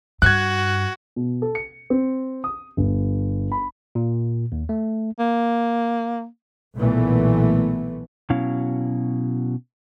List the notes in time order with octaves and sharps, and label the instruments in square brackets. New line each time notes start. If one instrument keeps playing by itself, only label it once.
[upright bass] G2 [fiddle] F#4 [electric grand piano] F#6 G#6
[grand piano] B2
A4
C#7
C4
D#6
G1
B5
[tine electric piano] A#2
D#2
A3
[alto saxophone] A#3
[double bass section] B1 A#2 E3 A3 B3
[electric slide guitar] B2 F#3 C#4 E4 F5